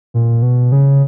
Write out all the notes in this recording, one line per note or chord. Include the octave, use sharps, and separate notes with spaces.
A#2
B2
C#3